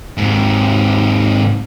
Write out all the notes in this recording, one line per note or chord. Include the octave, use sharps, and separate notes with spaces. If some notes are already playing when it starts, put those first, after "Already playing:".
G#2 C3